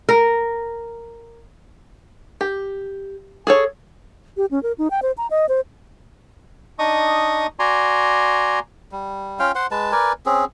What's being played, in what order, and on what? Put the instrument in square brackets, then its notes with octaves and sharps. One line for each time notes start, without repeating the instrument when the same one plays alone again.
[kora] A#4
[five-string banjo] G4
G#4 A4 C#5
[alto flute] G4
C#4
A#4
D#4
G5
C5
A#5
D#5
C5
[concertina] D4 D#4 D#5 C#6 D#6
F#4 D5 G#5 A#5 C6
[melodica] G3
C#4 F4 F5 G5
C5 F#5 C6
G#3 B4 A5
A#4 B4 D5 G#5
C4 C#4 G#4